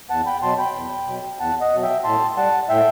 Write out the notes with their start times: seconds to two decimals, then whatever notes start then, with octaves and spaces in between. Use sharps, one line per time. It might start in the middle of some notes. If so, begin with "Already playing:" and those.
0.10 E2 F#5 A5
0.26 G5 B5
0.42 B2 F#3 A5 C6
0.58 G5 B5
0.75 E2
1.07 B2 F#3
1.40 E2 F#5 A5
1.61 D#5 F#5
1.72 B2 F#3
1.82 E5 G5
2.04 A2 A5 C6
2.37 G3 F#5 A5
2.69 A2 E5 G5